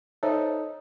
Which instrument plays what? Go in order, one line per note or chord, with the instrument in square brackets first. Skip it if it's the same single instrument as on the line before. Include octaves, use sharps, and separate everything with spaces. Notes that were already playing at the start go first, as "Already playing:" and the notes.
[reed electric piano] D#4 A4 [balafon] C5 C#5 E5